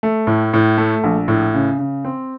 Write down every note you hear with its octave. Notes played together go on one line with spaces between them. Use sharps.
A3
A2
A2
A3
A#1
A2
C#3
C#3
C4